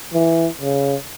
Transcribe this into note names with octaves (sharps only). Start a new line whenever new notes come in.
E3
C#3